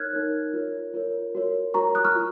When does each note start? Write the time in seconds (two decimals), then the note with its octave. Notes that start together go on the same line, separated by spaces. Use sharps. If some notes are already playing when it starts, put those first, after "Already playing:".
Already playing: D#4 A#4 C#5 F6 F#6 G#6
0.13 D#4 A#4 C#5
0.54 F4 A#4 C#5
0.94 F4 A#4 C#5
1.35 F#4 A#4 C#5
1.74 F#4 A#4 C#5 A#5 C#6
1.95 D#6 F#6
2.05 C#6 F6
2.16 F4